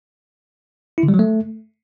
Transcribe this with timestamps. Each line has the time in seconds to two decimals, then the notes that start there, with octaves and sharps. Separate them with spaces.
0.98 E4
1.03 D3
1.08 G3
1.14 F#3
1.19 A3